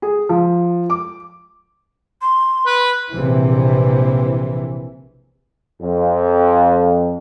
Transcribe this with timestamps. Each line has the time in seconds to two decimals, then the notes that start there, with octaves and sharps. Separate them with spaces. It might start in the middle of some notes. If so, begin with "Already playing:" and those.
0.02 G#4
0.29 F3
0.90 D6
2.21 C6
2.66 B4
3.11 A#1 C3 E3
5.82 F2